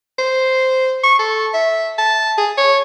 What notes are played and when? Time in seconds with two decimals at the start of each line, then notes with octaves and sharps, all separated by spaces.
0.19 C5
1.03 C#6
1.19 A4
1.54 E5
1.98 A5
2.38 G#4
2.57 C#5